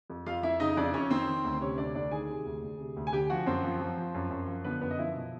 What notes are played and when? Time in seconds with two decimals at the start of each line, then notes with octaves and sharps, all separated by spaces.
0.10 F2
0.26 F2 F4 F5
0.43 F2 E4 E5
0.60 C#3 D#4 D#5
0.77 F2 D4 D5
0.93 F2 C#4 C#5
1.10 D#3 C4 C5
1.27 D#3
1.44 D2
1.61 C3 C#4 C#5
1.78 D2 D4 D5
1.95 D2 D4 D5
2.11 D#3 G#4 G#5
2.29 C3
2.45 D2
2.62 D2
2.79 C3
2.97 D2
3.07 G#5
3.13 D3 G4 G5
3.30 F3 F#4 F#5
3.46 F#2 C4 C5
3.64 F3
3.81 F3
3.97 F3
4.15 F#2
4.30 F#2
4.47 F3
4.64 D3 B3 B4
4.81 F#2 B3 B4
4.91 D#5
4.98 F3 E4 E5
5.15 B2